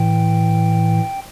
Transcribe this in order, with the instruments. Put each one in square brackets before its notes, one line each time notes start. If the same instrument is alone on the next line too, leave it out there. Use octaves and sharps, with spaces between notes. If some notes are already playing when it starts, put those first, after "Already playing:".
Already playing: [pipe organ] A2 E3 G5